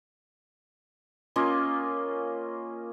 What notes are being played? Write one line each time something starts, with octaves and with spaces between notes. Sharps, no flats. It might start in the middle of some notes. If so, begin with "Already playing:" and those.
A#3 C#4 F4 D#5